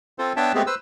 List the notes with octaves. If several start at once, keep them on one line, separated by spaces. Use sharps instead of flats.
C4 F4 A4 C5
B3 D4 C#5 E5 G5 A5
G#3 A3 B3 C4 G4 G#4
B4 C5 E6